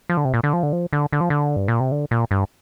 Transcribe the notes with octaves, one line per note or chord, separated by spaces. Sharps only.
F3
D3
C3
A#2
D3
F3
D3
F3
D3
D3
F3
D3
G2
A#2
C3
D3
A#2
G2